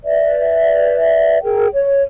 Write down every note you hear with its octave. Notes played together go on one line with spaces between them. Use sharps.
B4 D5 E5
G#4 A#4 G5
C#5